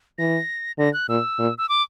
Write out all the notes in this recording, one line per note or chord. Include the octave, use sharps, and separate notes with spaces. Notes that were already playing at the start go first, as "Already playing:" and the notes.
E3 A#6
D3 A#6
F#6
A#2 E6
A#2
E6
D6